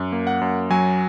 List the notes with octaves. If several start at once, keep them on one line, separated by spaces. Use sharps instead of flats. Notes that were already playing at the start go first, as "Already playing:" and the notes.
Already playing: F#2
A#3
F#5
F#2
F#3 G#5